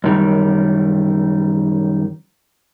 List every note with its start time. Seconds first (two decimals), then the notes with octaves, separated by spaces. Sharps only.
0.04 F#2 D#3 G3